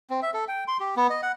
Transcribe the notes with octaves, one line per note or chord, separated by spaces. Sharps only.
C4
E5
A4
G5
C6
G4
B3
D#5
F#5